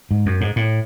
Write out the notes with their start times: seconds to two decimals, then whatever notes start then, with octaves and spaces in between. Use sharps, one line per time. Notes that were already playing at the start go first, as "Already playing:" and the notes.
0.11 G#2
0.26 F#2
0.41 G#2
0.56 A2